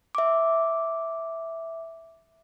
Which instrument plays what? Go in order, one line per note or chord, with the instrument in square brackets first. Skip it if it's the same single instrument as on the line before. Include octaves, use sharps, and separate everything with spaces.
[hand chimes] E5 D6